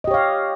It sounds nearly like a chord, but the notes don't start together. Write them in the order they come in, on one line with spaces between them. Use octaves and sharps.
D#5 G4 C#5 F5